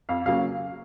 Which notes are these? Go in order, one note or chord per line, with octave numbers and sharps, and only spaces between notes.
F2 F5
C#3 F#3 A#3 C#4 F5